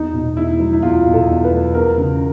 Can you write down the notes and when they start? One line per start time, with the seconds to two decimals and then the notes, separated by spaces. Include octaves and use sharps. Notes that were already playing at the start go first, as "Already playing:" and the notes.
Already playing: E2 D#4
0.14 B2
0.37 E2 E4
0.60 F#3
0.73 E4
0.82 E2 F4
1.06 B2
1.13 A4
1.28 E2
1.44 B4
1.52 F#3
1.74 E2 A#4
1.98 C#3